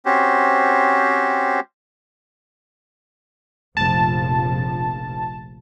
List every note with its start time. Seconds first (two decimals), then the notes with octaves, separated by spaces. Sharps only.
0.05 C4 C#4 F#4 G4 C5
3.77 F1 A#1 F3 A5